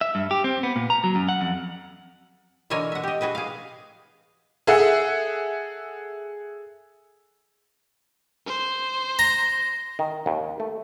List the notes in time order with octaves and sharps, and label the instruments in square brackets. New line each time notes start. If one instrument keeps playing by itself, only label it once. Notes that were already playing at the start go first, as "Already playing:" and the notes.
[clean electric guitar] E5
G2
G4
C4
B3
A#2
A#5
F#3
F#2
F#5
F2
[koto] B2 D3 E3 A#4 C#5 G#5
E5 F#5
G4 D#5
F#4 G#4 B4 D#5
G#4 F5
[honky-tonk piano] G#4 A4 E5 F#5
[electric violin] C5
[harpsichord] A#5
[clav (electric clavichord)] D#3
D#2
A3